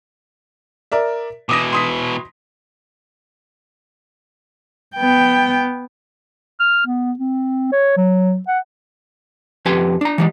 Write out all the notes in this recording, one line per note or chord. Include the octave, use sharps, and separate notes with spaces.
A#4 D5 E5
B2 E3 D6 D#6 A#6
C6 D#6 B6
B3 G5
F6
B3
C4
C#5
F#3
F#5
F2 G4 B4 G#5 C6
D4 A#5
E3 G3 G#3